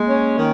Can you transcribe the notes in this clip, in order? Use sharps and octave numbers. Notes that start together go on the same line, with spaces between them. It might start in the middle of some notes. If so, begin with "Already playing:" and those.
Already playing: G#3 A#3
C#4
D#3